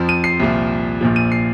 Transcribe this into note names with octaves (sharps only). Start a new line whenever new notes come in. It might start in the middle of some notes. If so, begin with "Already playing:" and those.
Already playing: F2 F3
D#7
C7
C2 A#2 F3
A#1 A#2 F3
D#7
C7